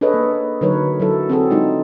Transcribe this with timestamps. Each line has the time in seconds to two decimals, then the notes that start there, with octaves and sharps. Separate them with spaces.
0.01 D4 G#4 A4 B4 C#5 D#5
0.14 A#3
0.61 D3 F#3 D#4 A#4 B4 C#5
1.00 F#3 E4 A4
1.29 C4 F#4 G#4 A4
1.50 G#3 D4 D#4 F4